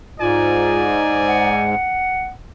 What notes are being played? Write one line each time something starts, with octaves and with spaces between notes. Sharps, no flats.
G#2 D#4 F4 D5 G#5
F#5